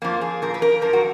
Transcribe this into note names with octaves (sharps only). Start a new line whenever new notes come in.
F2 F3 A#3
G#4
A#2 F3 A#4
B4
A#4
F#2 F3 A#4
F#4